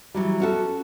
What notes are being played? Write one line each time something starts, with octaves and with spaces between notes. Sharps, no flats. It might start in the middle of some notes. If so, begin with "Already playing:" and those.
E3 F#3 G3
C#4 F#4 A4